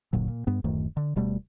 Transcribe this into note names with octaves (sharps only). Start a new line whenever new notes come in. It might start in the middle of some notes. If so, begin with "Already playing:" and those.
F#1 D2 A#2 F#3
A#2
G2 B3
D1 F#2 D#3 A3
D3
D1 B2 G3 A3